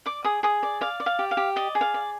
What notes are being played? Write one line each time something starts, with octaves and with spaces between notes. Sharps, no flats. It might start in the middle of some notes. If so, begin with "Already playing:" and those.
D5 D6
G#4 D#6
G#4 D#6
D5
D5 F5
D5
F5
G4
F5
G4
D5 D#5
G#4
F5
D5